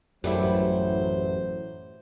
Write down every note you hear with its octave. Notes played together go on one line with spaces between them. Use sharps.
A1 F#2 F#3 G3 A3 E4 C5